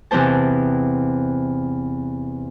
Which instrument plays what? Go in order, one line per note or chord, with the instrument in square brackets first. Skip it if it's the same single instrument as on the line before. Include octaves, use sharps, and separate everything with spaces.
[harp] E2 C3 E3 C4 C5 A5